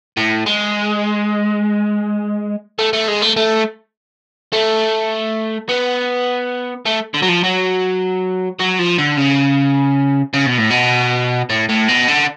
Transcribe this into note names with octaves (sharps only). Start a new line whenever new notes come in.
A2
G#3
A3
A3
G#3
A3
A3
A3
B3
A3
D3
F#3
F3
F#3
F#3
F3
D3
C#3
C#3
B2
A2
B2
A2
A2
B2
D3